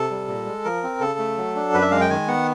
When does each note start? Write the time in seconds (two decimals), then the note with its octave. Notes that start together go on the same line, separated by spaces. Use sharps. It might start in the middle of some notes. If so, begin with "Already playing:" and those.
Already playing: C3 A4
0.11 G3
0.28 A#2
0.46 G#3
0.65 F3 A#4
0.84 C4
1.00 C#3 A4
1.19 A3
1.37 F#3
1.55 D4
1.74 F#2 B4
1.82 E5
1.91 G#3 F5
2.01 G5
2.10 D#3 G#5
2.28 B3 F#5